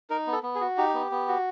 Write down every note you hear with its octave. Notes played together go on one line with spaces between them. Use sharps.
D#4 A#4
B3
A4
B3
G#4
F#4
D#4 G4
B3
B3
F#4